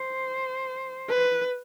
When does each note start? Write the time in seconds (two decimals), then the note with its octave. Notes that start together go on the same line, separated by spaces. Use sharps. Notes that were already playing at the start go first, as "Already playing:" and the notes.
Already playing: C5
1.09 B4